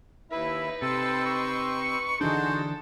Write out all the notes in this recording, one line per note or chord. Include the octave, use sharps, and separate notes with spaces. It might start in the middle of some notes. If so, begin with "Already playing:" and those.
D#2 D#4 E4 B4 E5
C3 A4 G5 C6 E6
C#6
D3 E3 D4 D#4 F#4 G#4 A4 C5